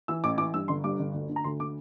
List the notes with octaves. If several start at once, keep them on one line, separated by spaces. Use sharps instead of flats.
E3 E6
A1 D6
E3 D6
G2 E6
G1 C6
G2 D6
G1
D2
D3
A#5
D2 C6
D3 D6